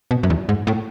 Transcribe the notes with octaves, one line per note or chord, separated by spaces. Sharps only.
B2
F#2
E2
G#2
A2